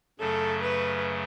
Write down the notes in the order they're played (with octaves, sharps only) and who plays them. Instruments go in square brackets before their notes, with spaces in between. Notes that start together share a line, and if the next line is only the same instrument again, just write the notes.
[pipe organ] F#2 C#3 F#3 A3 [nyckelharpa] A4
[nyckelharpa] B4